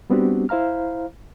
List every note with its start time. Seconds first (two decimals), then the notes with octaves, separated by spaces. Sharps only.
0.10 G3 B3 C4 D4 F#4 G4
0.49 E4 C5 F5 A#5 F6